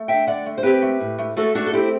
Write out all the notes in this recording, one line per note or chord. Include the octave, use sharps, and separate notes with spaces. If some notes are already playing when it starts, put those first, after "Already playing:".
Already playing: A3
D3 E5 G5
D3 D5 F#5
A3
C5
C4 G4 B4
A3
A2
A3
A3 F#4 A4
A3 D4 F#4
A4
C4 E4 G4